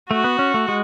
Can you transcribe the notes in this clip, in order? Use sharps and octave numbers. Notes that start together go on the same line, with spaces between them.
A3 F#4
B3
C#4
A3
G#3